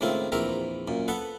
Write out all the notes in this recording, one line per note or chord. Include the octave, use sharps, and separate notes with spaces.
C#2 A2 D#3 C4 E4 F4
A#1 E2 C4 A#4 E5 A#5
F#2 A#2
B3 A4 B4 F#5